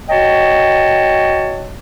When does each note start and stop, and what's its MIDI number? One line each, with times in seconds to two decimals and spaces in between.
0.10 1.73 66
0.10 1.73 73
0.10 1.73 75
0.10 1.73 79
0.10 1.73 81